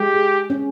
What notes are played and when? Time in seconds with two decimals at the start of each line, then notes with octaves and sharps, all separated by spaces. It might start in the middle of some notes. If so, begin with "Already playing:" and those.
Already playing: G#3 G4
0.15 G#4
0.50 C#4